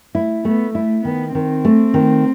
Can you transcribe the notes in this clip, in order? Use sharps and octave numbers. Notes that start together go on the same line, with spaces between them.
A3 E4
A3 B3
A3 E4
D#3 B3
D#3 C4
A3
D#3